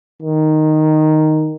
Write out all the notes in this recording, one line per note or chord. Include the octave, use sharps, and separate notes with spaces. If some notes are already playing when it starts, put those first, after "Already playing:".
D#3